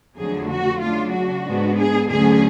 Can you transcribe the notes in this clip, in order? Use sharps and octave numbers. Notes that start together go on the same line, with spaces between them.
F2 D3 F#3 A3 G#4
F#4
C#3 F#3 A3 D4 F4
F#4
G#2 G#3 B3 D4
G#4
D2 D3 F#3 C#4 G#4